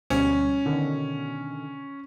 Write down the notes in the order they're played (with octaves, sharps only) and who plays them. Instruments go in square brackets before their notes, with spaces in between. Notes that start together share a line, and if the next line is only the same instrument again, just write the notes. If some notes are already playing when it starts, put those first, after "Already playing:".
[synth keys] D2 B2 G3 [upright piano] C#4
[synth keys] B2 D3 D#3